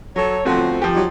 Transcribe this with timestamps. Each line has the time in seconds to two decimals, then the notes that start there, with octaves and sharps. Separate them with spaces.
0.16 F#3 A4 C#5
0.45 G1 F3 A3 C4 F#4
0.82 F3 G4
0.94 F#3 G3 D#4